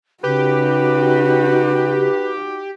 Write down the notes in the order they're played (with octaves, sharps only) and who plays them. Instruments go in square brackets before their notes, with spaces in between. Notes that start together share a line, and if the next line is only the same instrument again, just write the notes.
[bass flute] C#3 [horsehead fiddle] D#4 F#4 [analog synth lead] G4 [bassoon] B4